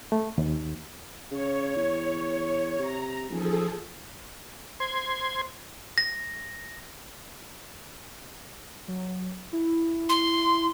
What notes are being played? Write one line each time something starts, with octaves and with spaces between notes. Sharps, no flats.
A3
D#2
C#3 C#5
E2
C3 A#5
D#1 F3 G#4 A4
C5 C6 G#6
A#6
F#3
E4
C6